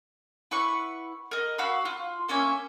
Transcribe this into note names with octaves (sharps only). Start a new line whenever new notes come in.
E4 B4 F#5 C#6
A#4 D#5
F#4 F5 B5 E6
F4
A#3 C#4 E5 G#5